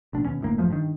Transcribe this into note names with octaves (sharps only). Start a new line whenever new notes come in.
A1 B2 D4
D#2 B2 C#4
G1 A2 A#3
A1 F#2 F3 A3
G2 D#3